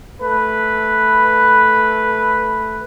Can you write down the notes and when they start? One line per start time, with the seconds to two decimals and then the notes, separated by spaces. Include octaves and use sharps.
0.22 A3 B4